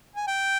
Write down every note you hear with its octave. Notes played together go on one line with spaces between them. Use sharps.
G#5
G5